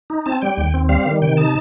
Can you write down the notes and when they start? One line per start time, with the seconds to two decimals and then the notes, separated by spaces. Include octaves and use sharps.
0.10 D#4
0.26 C4 A5
0.41 G3 G5
0.57 D#2
0.74 C4
0.89 G3 F5
1.06 D#3
1.22 C3 G5
1.37 D#4 A5